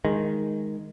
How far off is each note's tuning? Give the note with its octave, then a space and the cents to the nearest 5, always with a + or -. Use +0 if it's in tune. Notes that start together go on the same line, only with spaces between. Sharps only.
D#3 +0 G#3 +0